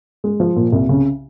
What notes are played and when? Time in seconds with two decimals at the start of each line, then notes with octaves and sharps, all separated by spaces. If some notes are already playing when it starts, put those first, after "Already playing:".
0.24 G#3
0.40 F3
0.56 A#2
0.72 C2
0.89 C#3